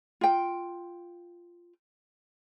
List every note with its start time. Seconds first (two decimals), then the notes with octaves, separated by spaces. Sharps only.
0.21 F4 G5